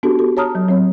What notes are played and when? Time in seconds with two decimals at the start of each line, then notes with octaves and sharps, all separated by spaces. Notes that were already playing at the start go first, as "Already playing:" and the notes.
0.03 B3 D4 F#4 G4 A4
0.19 A4
0.37 C#5 A5 A#5 D#6 F6
0.55 F#3
0.68 F#3 C4 C#5